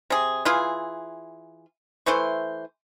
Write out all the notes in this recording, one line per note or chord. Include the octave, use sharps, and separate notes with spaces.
C3 G#4
E3 F4 G#4
E3 A3 C5 C#6